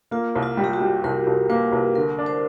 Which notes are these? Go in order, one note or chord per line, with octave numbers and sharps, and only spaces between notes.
A#3 F4
C2
F4
G3
G4
F#4
G3
C2 A#4
C2
A#3 B4
C2
D3 A#4
D4
C5